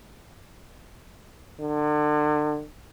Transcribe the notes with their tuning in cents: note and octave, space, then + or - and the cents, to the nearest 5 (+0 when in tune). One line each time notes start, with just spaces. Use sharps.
D3 +35